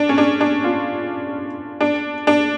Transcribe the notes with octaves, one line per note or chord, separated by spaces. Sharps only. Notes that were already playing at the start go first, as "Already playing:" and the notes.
Already playing: D4
C#4
D4
D4
F4
D4
D4